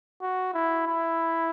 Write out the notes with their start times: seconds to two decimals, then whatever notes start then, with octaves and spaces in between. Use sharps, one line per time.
0.22 F#4
0.54 E4
0.87 E4